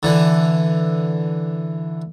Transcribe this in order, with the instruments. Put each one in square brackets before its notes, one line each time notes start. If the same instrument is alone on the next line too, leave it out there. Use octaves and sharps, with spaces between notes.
[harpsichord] D3 E3